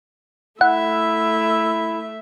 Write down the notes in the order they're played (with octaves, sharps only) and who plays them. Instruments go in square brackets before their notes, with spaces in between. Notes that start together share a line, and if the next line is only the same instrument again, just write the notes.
[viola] A3 E5 [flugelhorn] E4 [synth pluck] F#5